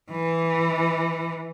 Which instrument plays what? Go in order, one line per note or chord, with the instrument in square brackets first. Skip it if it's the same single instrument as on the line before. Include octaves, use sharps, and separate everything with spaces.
[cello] E3